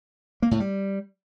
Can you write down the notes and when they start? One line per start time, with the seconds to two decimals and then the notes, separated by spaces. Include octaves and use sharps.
0.42 A#3
0.51 A2
0.60 G3